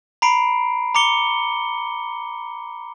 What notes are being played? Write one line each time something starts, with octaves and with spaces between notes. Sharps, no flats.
A#5 B5 C7 D7
A#5 D6 C#7 G7